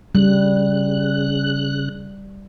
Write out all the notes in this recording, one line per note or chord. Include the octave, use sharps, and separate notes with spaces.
C#3 G3 F#6